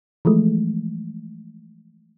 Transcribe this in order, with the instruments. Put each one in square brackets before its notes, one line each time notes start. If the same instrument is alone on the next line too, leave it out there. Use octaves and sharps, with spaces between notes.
[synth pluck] E3 F3 G#3 A3